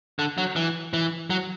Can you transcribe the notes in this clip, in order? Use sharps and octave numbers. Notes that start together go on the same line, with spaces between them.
D3
F#3
E3
E3
F#3